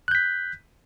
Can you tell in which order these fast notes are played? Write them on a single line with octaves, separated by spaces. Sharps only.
F#6 G6 B6